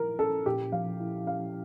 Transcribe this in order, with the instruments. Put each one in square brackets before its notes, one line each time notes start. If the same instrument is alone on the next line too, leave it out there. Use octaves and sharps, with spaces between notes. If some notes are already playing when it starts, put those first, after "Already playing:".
Already playing: [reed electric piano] A#2 F3 E4 [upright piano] A#4
[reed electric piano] C#4 [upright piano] A4
[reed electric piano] A#2 [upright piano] G4
[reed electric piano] F3 [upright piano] F5
[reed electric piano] E4
[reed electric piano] C#4 [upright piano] F5